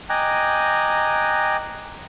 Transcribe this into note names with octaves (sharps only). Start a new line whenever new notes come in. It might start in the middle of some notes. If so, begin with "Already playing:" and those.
D#5 G5 G#5 A#5 D6 F#6